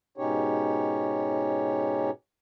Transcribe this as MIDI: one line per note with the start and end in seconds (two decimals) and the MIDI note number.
0.18 2.10 44
0.18 2.10 47
0.18 2.10 61
0.18 2.10 63
0.18 2.10 67
0.18 2.10 73